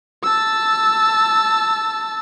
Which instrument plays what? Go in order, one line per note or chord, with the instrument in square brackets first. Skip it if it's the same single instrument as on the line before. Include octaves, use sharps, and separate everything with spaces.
[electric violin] A5 E6